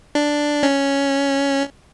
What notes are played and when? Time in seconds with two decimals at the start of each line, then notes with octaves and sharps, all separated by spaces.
0.15 D4
0.63 C#4